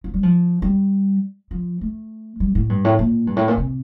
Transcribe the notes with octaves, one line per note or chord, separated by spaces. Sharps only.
F3
G3
F3
G3
F3
A3
G3
A2
G2
A2
A#2
G2
A2
A#2
C3